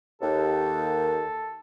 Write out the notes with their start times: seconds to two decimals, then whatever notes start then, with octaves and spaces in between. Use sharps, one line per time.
0.22 D#2 A4